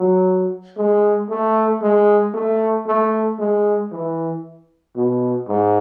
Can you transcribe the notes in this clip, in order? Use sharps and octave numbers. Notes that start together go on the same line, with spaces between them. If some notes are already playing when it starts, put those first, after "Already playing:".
Already playing: F#3
G#3
A3
G#3
A3
A3
G#3
E3
B2
G#2